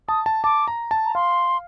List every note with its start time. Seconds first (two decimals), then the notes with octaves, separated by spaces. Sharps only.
0.09 A5 D#6
0.26 A5
0.44 A5 D6
0.68 A#5
0.91 A5
1.05 A#5
1.15 F5 C6